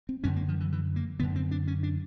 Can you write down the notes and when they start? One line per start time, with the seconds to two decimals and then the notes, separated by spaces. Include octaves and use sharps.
0.09 C4
0.24 F#2 D3 C#4
0.36 A#3
0.49 F3
0.60 E3
0.72 E3
0.96 A#3
1.20 F#2 D3 B3
1.36 C4
1.51 D4
1.68 C#4
1.83 D4